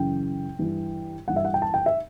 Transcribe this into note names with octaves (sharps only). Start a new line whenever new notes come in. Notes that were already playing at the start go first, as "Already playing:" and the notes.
Already playing: F#2 C#3 E3 G5
G2 E3
G2 E3 F#5
E5
F#5
G5
A5
G5
E5